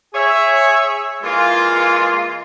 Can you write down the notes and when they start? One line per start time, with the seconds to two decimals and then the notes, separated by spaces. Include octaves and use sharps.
0.15 G#4 C#5 E5
1.23 E3 G#3 A#3 F4